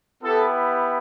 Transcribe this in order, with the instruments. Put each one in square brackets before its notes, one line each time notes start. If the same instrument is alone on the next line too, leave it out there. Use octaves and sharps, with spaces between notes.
[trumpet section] B3 E4 G4 A4